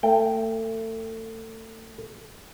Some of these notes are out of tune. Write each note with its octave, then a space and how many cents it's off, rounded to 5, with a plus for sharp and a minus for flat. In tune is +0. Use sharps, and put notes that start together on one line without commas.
A3 +30 G5 +0